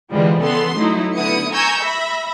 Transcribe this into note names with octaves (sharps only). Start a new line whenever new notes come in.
D3 E3 F3 G3 G#3
C#3 E3 B3 A4 C6
F#3 A3 D#4 E4
D3 B3 E4 D#6 C#7
G#5 A#5 C#6 E6 G6 G#6
E5 B5 A#6